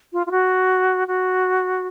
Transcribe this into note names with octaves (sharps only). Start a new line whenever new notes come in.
F4
F4
F#4
F#4